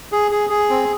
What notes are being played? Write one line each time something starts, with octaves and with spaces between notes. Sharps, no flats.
G#4
G#4
G#4
C4